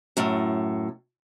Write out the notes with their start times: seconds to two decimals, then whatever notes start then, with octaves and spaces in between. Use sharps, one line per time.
0.17 F#2 A2